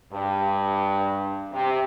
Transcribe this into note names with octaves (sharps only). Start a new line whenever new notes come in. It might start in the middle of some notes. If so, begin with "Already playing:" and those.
G2
C3